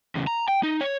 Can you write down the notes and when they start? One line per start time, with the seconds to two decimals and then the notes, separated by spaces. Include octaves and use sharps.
0.15 E2 C#3
0.27 A#5
0.48 G5
0.63 D#4
0.81 C#5